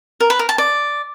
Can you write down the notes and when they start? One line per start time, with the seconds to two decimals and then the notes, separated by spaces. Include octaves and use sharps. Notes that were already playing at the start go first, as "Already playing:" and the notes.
0.20 A#4
0.30 B4
0.39 A#4
0.49 A5
0.58 D5